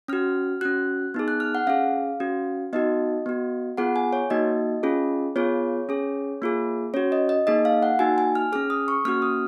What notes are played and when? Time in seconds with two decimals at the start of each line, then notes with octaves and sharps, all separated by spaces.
0.08 C#4 F#4 F6
0.61 C#4 F#4 F#6
1.14 B3 D#4 G#4
1.28 F#6
1.40 F6
1.55 F#5
1.67 C#4 G#4 F5
2.20 C#4 F#4
2.73 B3 D#4 F#4 D#5
3.26 B3 F#4
3.77 B3 F4 G#4 F#5
3.96 G#5
4.13 C#5
4.30 A#3 D#4 F#4 D#5
4.83 C#4 F4 G#4
5.36 B3 F4 G#4 C#5
5.89 C#4 G#4
6.42 A#3 F4 G#4
6.94 C#4 F#4 C#5
7.12 D#5
7.29 D#5
7.47 A#3 D#4 G#4 D#5
7.65 F5
7.83 F#5
7.99 A#3 D#4 F#4 G#5
8.18 G#5
8.35 F6
8.52 C#4 G#4 F6
8.70 D#6
8.88 C#6
9.05 A#3 C#4 F#4 F6
9.22 D#6